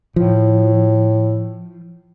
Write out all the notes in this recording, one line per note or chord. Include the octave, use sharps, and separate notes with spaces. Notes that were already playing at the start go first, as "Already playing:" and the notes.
A2 F3